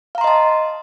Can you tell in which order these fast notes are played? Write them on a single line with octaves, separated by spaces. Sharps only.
F5 A#5 C6 D#5 A5